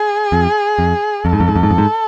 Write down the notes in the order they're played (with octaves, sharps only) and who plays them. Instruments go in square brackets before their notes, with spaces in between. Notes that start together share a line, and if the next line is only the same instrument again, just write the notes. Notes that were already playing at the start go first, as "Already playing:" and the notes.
Already playing: [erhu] G#4
[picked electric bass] F2
F2
[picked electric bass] F2 [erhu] A4
[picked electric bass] G#2
F2
G#2
F2
G#2
F2
G#2